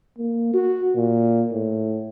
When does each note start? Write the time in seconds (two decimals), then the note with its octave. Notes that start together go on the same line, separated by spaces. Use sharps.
0.18 A#3
0.54 F#4
0.96 A#2
1.52 A2